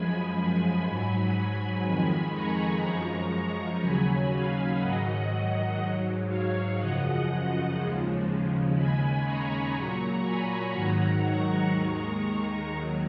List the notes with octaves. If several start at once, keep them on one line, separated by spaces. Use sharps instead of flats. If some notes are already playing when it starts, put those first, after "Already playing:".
Already playing: F#2 F3 G#3 G#5 B5
G#5 B5
G#2 F#3 G#5 B5
G#5 B5
F2 D#3 G#3
A#5 C#6
F#2 F3 G#3
D#2 C#3 F#3 G#5 B5
F5 G#5
G#2 D#3 F#3 D#5 F#5
G#2 F#3
C#5 F5
F#2 C#3 F3 D#5 F#5
D#2 C#3 F3 G#3
D#2 C#3 G#3 G#5 B5
A#5 C#6
A#2 F#3
G#5 B5
G#2 D#3 F#3 F#5 A#5
A#5 C#6
D#2 D#3 G#3 A#5 C#6
D#2 D#3 F#3